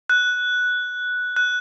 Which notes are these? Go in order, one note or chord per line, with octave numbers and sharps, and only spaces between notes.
F#6
F#6